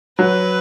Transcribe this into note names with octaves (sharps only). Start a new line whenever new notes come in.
F#3 B4